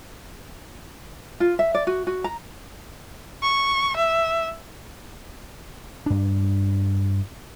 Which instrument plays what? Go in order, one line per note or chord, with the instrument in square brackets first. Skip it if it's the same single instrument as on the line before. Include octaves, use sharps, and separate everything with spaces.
[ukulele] F4
E5
D5
F#4
F#4
A#5
[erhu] C#6
E5
[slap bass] G2 D4